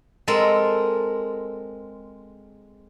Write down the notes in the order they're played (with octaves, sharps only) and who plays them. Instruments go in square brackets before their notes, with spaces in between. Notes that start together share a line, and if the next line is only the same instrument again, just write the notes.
[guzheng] G#3 C4 A4 A#4